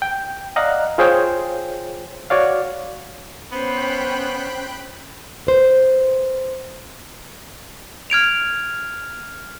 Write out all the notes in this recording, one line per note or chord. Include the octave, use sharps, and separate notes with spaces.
G5
D5 D#5 F5 F#5 A#5 F#6
F4 G#4 C5 C#5 G5 C6
F#4 C#5 D5 F5
B3 C#4 C5 G5 B5 F#6
B4 C5
F6 G#6 D7 F7